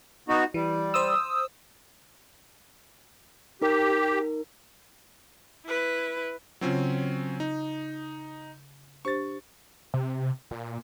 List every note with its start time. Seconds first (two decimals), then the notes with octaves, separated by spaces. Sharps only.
0.28 B3 D#4 F#4
0.54 E3 G3
0.94 C5 D#6 E6
3.62 D#4 G4 A#4
5.66 E4 B4
6.61 C#3 F#3 C4 C#4 F4
7.40 D#4
9.05 D4 G4 C5 C#6 A6
9.94 C3
10.51 A#2